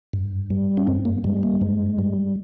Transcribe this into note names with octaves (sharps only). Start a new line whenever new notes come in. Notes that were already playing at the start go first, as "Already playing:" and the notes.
G2
G3
C#4
G2 C4
A#3
G3 G#3
A#3
G2 G#3
G3